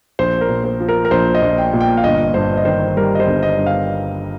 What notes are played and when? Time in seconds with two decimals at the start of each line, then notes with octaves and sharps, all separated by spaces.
0.19 A#1 C5
0.41 A#4
0.49 A#2
0.64 C5
0.80 F3
0.89 A#4
1.05 A#4
1.11 A#1 C5
1.35 D#5
1.42 A#1
1.58 G5
1.73 A#2
1.81 G5
1.97 F5
2.04 G1 D#5
2.34 G2 C5
2.57 D#5
2.65 D#3 C5
2.97 G3 A#4
3.15 D#5
3.20 C5
3.27 G1
3.43 D#5
3.58 G2
3.66 F5